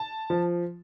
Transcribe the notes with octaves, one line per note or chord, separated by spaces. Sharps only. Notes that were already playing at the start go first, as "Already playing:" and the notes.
Already playing: A5
F3